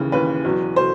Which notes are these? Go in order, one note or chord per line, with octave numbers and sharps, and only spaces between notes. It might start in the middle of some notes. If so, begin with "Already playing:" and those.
Already playing: D#2 C#3 E3
D#2 C#3 E3 B4
E2 B2 F#3
B2 F#3 C5